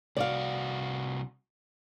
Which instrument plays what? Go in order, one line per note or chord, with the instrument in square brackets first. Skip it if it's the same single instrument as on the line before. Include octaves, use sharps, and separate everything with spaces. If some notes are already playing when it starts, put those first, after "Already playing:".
[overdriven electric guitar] C2 F#4 [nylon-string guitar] D5 F5